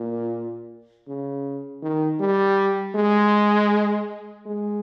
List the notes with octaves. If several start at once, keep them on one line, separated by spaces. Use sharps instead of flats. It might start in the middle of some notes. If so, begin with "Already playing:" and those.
Already playing: A#2
C#3
D#3
G3
G#3
G#3